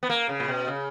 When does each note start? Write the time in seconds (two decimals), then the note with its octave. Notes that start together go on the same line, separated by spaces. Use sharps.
0.03 B3
0.10 A#3
0.29 C#3
0.40 A#2
0.48 B2
0.67 C#3